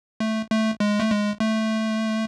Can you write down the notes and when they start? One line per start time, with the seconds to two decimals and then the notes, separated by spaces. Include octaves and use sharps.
0.20 A3
0.50 A3
0.80 G#3
1.00 A3
1.11 G#3
1.40 A3